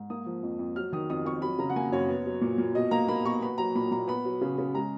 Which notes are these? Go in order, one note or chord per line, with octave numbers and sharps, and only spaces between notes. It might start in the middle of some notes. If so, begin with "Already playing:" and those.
Already playing: G#2
A#3 D#6
F3
F2
F2
F#3 F6
D#3 D#6
F2 D#6
F2 C#6
F#3 B5
C#3 A#5
F#5
A#3 G#5
F#2 C#5
B3
F#3
A#2
A#2
B2 D#5
A#3 A#5
A#3 B5
B2 C#6
B3 B5
F#3 A#5
A#2 B5
A#2 A#5
B3 B5
F#3
C#3
C#3
G#3 A#5